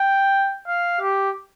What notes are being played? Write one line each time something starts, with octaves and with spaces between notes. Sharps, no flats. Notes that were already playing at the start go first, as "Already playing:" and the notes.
Already playing: G5
F5
G4